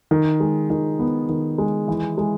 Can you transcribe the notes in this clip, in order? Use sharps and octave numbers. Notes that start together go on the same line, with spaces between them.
D#3
G#3
D#3
B3
D#3
G#3
E3
G#3